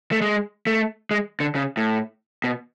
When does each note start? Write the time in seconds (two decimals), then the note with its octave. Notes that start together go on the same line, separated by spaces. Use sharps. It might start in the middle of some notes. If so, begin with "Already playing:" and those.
0.11 A3
0.21 G#3
0.67 A3
1.11 G#3
1.40 D3
1.55 C#3
1.77 A2
2.44 B2